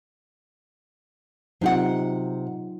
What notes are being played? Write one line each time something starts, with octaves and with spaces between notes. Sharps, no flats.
C3 F#3 D#4 F4 G4 F#5